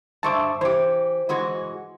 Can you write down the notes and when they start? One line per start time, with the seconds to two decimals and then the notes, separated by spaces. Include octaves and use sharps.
0.23 G2 C5 E5 A5 C#6 D6
0.61 E3 G4 C5 D6
1.29 E3 G#3 F#4